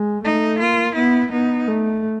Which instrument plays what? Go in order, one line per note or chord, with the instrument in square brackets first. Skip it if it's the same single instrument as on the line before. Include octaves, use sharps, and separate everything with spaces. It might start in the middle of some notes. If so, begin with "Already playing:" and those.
Already playing: [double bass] G#3
[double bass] A3 [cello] D#4
[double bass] A#3 [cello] F4
[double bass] B3 [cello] E4
[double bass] B3 [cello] D#4
[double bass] A3